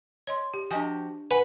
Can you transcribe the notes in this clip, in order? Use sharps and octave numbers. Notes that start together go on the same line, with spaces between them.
C#5 D#5 C6
G4
F3 D4 F#4 G4 D#5 G#5
B4 F#5 G#5